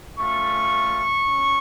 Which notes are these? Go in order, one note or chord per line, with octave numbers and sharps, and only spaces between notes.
A3 C#4 F4 C#6
C#4